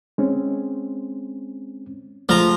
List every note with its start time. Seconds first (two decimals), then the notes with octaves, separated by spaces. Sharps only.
0.18 G#3 C4 C#4
2.29 F3 G#3 A3 A#5 F6